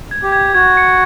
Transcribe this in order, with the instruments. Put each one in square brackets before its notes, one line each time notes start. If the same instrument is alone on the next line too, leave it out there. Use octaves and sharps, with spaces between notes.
[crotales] G#6
[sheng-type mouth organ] G4
[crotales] G#6
[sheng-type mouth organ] F#4 [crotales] G#6
[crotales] C#7